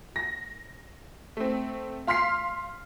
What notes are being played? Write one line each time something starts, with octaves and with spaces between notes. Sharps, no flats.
A#6
A3 C4
F5 C6 F6 B6 C7